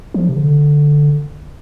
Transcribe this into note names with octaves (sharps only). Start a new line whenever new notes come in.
F3
C3
D3